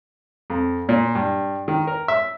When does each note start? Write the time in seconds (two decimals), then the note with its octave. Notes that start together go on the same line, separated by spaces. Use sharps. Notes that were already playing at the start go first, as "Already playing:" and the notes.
0.50 F2
0.89 A#2
1.15 G2
1.68 D#3
1.87 A#4
2.08 E5